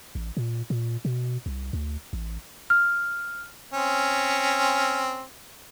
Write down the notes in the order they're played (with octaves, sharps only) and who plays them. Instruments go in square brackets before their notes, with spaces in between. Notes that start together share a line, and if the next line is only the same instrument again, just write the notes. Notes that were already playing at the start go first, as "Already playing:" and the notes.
[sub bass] A1
A#2
A#2
B2
C2
D2
A1
[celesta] F6
[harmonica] C4 C#4